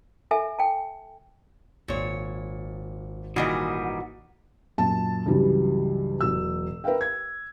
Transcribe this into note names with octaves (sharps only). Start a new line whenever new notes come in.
A4 E5 G#5
G5 A5
G#1 A#2 C#5
A#2 D#3 E3 G3 F#4 G#4 D#5
F#2 A#2 A5
C#2 G2 E3 F#3 G3
E1 F#3 E6
A#4 B4 E5 F5 G5
G#6